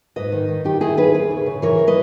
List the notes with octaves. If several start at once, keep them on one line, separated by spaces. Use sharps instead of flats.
G#2 B4 D#5
D#3
D#3
D#3 D#4 G4
D#3 E4 G#4
D#3 G#4 B4
D#2 G#4 B4
C#3
C#3
E3 A#4 C#5
B4 D#5